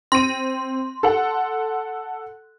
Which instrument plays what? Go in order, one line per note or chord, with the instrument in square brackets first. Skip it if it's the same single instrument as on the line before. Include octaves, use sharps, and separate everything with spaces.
[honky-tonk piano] C4 D#7 [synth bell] C6
[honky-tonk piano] A4 F#5